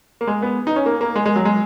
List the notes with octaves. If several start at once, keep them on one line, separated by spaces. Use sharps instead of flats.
A#3
G#3
B3
D#4
C#4
A#3
A#3
G#3
G#3
F#3
G#3